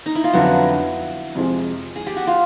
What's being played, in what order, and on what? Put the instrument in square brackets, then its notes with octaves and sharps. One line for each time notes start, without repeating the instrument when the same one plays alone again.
[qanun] D#4
E4
F4
[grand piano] F2 D3 F#3 B3 [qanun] E4 F#4
[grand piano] F2 C3 F3 G#3
[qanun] G#4
G4
F#4
F4